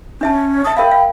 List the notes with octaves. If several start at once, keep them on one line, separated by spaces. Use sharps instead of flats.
C#4 D4 E5 A5
E5 A5 D#6
A#4 E5 F5 G5 B5
F5